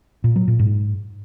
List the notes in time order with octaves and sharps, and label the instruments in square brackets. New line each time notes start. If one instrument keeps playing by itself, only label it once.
[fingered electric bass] A#2
F#3
A#2
G#2